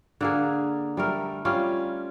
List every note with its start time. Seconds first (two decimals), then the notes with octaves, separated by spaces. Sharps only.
0.21 D3 A#3 G#4
0.97 G3 A3 A#4
1.45 G3 C#4 F4